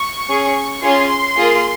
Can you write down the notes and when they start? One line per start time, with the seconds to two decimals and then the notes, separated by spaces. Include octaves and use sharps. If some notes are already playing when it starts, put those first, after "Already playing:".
Already playing: C#6
0.28 C#4 G#4
0.83 C#4 F4 G#4 C6
1.37 A#3 F4 G#4